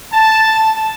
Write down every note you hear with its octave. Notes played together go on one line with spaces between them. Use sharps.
A5